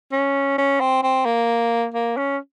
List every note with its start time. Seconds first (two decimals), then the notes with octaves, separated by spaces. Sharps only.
0.12 C#4
0.58 C#4
0.80 C4
1.03 C4
1.25 A#3
1.94 A#3
2.17 C#4